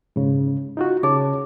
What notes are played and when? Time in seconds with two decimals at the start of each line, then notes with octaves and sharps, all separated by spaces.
0.16 G#2 C#3
0.77 D#4 F4 F#4
1.03 C#3 G#4 C#5 A5